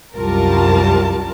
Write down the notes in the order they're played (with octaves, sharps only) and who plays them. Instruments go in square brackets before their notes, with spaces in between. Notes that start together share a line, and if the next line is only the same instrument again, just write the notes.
[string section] C2 F#2 G3 F4 A#4 A5